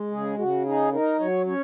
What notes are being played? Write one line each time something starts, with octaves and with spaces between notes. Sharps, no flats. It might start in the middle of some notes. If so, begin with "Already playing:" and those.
Already playing: G#3
C#3 G#4
C#3 F#4
D#4 G#4
D#4 A#4
F#3 C#5
C#4 C#5